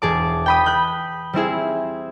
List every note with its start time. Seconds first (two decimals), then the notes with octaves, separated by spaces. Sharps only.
0.02 E1 G#4 A5 D6
0.46 G5 B5 D#6
0.66 B5 F#6 G6
1.33 G3 C4 E4 G#4